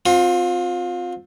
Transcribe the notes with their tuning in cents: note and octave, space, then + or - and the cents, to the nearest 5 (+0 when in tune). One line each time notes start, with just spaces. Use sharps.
C4 +0 F4 +30